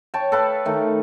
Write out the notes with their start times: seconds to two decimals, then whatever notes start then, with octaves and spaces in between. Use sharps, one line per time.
0.14 C#5 G5 A5
0.32 A4 B4 F5
0.65 D#3 A3